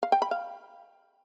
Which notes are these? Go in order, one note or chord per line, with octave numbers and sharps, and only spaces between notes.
F5
G5
B5
F5